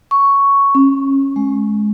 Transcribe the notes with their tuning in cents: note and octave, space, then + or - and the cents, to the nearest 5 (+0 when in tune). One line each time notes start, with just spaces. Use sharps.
C#6 +5
C#4 -25
G#3 +15